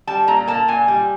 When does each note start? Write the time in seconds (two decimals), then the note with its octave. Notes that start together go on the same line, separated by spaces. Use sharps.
0.07 G3 A5
0.27 A#2 A#5
0.48 A#3 A5
0.68 A#2 G#5
0.88 G3